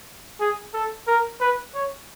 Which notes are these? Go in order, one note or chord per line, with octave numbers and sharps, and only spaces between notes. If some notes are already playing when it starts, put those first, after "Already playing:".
G#4
A4
A#4
B4
C#5